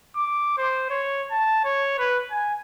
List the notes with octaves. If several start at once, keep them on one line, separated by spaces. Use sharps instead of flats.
D6
C5
C#5
A5
C#5
B4
G#5